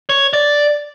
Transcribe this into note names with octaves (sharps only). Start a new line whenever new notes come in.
C#5
D5